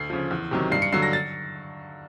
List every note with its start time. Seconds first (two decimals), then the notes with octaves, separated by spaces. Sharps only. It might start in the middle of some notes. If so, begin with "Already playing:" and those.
Already playing: D2 C7
0.10 C#3 F3
0.31 E2
0.51 C3 D#3 F#3
0.72 G2 C7
0.82 C#7
0.92 D3 F#3 C7
1.02 A#6
1.13 A6